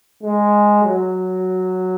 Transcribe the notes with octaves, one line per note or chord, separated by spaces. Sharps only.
G#3
F#3